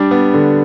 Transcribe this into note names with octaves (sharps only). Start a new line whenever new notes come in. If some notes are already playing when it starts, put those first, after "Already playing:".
Already playing: G3 D4
B3
D3